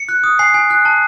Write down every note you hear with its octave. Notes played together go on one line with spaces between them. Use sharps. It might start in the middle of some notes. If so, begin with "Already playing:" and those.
Already playing: C#7
F#6
D#6
G#5 C7
G#5
F#6
A5